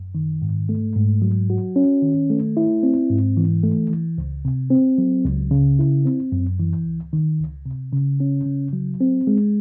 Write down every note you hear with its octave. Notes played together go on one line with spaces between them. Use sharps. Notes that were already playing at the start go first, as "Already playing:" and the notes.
Already playing: F#2
D#3
G#2
A3
G#2
F#3
F#4
C#4
D#3
A3
E4
C4
G#2
E3
A3
E3
C#2
C3
C4
F#3
C#2
C#3
E4
C4
F#2
E3
C#2
D#3
C#2
C3
C#3
C#4
C#3
F#3
C4
G#3